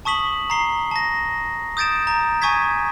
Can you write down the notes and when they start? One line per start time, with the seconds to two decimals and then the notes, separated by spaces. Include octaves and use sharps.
0.05 A5 C#6 D#6 B6 F#7
0.50 A#5 C7 G7
0.91 A5 A#6
1.77 D#6 G6 A6 D7 E7
2.07 A#5
2.42 G#5 C#6 D#6 G#6 B6